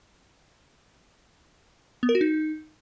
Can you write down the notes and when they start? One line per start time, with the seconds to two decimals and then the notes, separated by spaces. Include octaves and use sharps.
2.03 B3
2.09 A#4
2.15 F#4
2.21 D#4